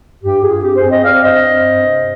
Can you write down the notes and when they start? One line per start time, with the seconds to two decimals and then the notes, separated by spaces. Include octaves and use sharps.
0.22 G2 G4
0.42 G2 F4 G#4
0.63 C4 G4
0.76 G#4 C5
0.84 C4
0.90 C5 D#5
1.04 C4 D5 F5
1.24 G2 C5 D#5
1.44 C4
1.65 G2
1.85 C3